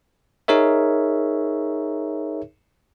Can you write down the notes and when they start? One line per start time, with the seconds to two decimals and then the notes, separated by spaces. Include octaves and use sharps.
0.48 D#4 G#4 A#4 C#5 E5